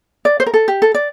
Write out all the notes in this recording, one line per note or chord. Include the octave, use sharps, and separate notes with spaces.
D5
C5
A#4
A4
G4
A4
D5